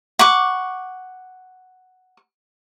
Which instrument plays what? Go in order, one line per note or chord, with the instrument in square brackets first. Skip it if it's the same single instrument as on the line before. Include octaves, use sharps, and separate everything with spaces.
[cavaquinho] F#5 C#6 D6